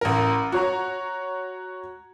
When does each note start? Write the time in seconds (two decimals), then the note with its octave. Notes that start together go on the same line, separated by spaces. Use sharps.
0.01 A1 A#4
0.52 F#4 C#5 A#5